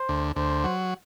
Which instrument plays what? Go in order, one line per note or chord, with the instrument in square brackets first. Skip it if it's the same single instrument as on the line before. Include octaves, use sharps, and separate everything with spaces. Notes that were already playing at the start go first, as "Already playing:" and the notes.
Already playing: [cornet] C5
[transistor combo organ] D2
[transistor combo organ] D2 [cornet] C5
[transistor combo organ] F#3